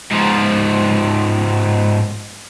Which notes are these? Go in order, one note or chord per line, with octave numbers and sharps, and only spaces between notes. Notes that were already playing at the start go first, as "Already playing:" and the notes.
G#2 F3